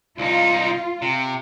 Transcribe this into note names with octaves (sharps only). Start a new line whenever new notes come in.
C2 D#4 F4
C3